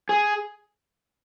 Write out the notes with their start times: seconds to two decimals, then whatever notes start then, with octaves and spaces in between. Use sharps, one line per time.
0.09 G#4